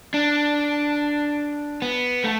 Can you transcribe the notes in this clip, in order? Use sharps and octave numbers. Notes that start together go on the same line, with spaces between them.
D4
B3
A3